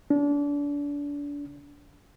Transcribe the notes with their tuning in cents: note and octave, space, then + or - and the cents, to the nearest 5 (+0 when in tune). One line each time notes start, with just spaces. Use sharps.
D4 -30